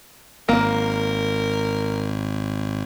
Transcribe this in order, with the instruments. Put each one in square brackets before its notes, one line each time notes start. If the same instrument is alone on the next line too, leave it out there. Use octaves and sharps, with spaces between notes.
[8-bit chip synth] G#1 [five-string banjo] A#3 [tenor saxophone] A#4